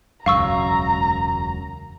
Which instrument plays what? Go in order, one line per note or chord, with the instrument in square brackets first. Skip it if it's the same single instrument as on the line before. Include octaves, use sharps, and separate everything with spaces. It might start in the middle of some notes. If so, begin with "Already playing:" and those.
[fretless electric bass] E1 C#2 F#2 [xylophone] F5 C#6 E6 [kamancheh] A#5